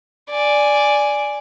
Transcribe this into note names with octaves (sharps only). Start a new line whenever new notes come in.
D5 G#5